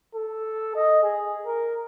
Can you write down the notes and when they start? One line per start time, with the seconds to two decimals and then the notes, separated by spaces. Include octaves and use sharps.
0.15 A4
0.75 D#5
1.03 G#4
1.46 A#4